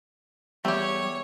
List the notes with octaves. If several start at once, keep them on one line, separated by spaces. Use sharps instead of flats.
E2 G3 A3 G4 C#5